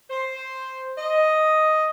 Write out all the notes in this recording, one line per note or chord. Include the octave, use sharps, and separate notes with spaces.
C5
D#5